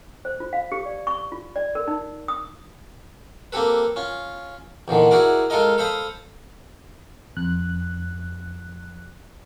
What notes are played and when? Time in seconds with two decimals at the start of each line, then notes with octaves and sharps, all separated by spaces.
0.25 C5
0.40 F4
0.53 F5
0.72 G4
0.86 D5
1.07 C#6
1.32 F4
1.56 D5
1.75 A#4
1.87 D#4
2.28 D#6
3.52 A#3 C4 G4 A4 B4
3.96 C#4 F4
4.88 E2 A#2 D3 D#3
5.11 E4 F#4 G#4 A#4 D5
5.50 G#3 F4 A4 A#4 D#5
5.78 A4 C5 F5 B5 D#6
7.37 F2 F#6